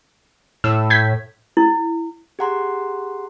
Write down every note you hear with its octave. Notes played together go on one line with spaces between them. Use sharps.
A2 E6
G6 G#6 B6
E4
G4 G#4 F#5 A#5 C6